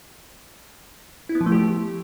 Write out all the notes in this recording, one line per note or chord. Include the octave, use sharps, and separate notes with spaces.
E4
B3
F3
A3
G4